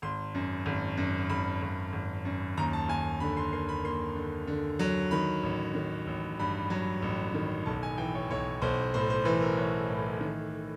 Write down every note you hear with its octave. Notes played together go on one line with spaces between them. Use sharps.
G#1 C6
F#2
G#1
F#2
G#1 B5
G#1
G#1
F#2
D#2 A#5
A5
D#2 G#5
D3 B5
C6
A#3 C6
B5
A#3 C6
D3
D3
F#3
D#3 B5
A1
D#3
A1
G2 B5
F#3
A1
D#3
B1 A5
G#5
E3 G5
C#5
B1 C#5
B1 C5
A2 C5
C5
E3 B4
A#4
E3 C#5
A2
D#3